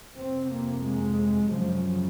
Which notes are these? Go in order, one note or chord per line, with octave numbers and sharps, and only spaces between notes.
F2 C3 C4
A#3
G#3
F#2 C#3 F3